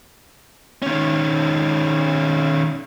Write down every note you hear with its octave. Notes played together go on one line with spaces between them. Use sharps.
D#3 C#4